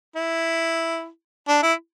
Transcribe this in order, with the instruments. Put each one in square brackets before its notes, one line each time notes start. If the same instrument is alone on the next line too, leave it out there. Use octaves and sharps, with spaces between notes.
[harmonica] E4
D4
E4